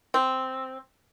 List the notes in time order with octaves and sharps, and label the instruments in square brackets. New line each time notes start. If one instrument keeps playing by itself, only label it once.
[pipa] C4